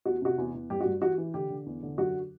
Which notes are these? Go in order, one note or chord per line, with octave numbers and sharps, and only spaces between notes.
E2 F#4
C3 F#4
E2
E2
G2 G4
F#4
G2
E3 F#4
E3
D3 G4
D3
E2
D3
F#2 F#4